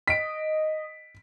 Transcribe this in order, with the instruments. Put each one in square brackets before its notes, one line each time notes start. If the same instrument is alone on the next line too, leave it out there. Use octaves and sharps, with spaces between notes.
[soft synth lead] D#5 [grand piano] B6 D7